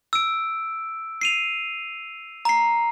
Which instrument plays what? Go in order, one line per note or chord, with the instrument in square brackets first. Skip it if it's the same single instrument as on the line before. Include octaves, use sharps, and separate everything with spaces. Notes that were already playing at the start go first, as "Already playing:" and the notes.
[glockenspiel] E6 D7
C7 D#7 F7
A#5 C7